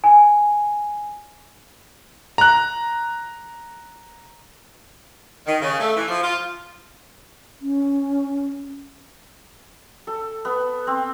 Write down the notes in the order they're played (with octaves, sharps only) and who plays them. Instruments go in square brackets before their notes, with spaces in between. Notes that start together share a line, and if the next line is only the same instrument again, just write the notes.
[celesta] G#5
[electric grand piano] A#5 F#6
[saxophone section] D#3
C#3
A3
E3
F3
F4
[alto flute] C#4
[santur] A4
B3
C4